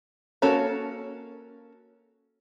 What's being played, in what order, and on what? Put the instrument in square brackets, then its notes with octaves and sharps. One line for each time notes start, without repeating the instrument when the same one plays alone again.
[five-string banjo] A#3 C#4 F#4 A4